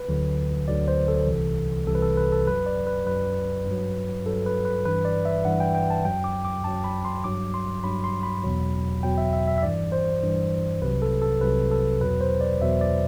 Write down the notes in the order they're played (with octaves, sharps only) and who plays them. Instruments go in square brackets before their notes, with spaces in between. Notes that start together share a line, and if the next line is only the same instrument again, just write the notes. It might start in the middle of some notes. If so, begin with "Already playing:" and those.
Already playing: [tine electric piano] B4
D2 D3 F#3
D2 D3 F#3 D5
C5
A4
C2 C3 E3
C2 C3 E3 A4
B4
A4
B4
A4
F#2 F#3 B4
D5
B4
F#2 F#3 B4
G2 F#3
G2 F#3 A4
B4
B4
G2 E3 B4
D5
E5
G2 E3 F#5
G5
G5
A5
F#2 F#3 G5
D6
D6
F#2 F#3 A5
B5
C6
G2 F#3 D6
C6
G2 F#3 B5
C6
B5
E2 B2 F#3
E2 B2 F#3 G5
E5
E5
E5
E5
G2 E3 D5
C5
G2 E3
C2 C3 F#3 B4
A4
A4
C2 C3 F#3 B4
A4
E2 B2 F#3 B4
C5
D5
E2 B2 F#3 E5
D5